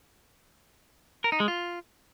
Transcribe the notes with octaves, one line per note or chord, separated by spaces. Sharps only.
A#4
D#4
G#3
F4